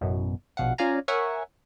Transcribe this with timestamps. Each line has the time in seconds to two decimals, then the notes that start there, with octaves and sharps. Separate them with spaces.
0.01 A1 F#2 B2
0.57 A#1 B2 F5 F#5
0.78 C#4 F4 D5 F5 G#5 A#5
1.08 A#4 C#5 E5 F#5 G#5 C#6